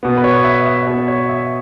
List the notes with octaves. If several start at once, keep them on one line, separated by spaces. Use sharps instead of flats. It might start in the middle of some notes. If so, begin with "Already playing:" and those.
B2 B3
B4
C#5
E5
E5
B2 B3 C#5
C#5
E5